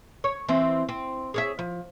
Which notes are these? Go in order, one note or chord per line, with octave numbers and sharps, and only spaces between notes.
C#5
E3 C4
C4
G#4 C#5 E5
F3